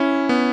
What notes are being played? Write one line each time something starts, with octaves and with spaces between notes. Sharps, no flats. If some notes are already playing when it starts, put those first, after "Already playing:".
Already playing: C#4 E4
B3